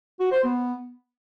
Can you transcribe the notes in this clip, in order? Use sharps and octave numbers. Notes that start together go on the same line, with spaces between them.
F#4
C5
B3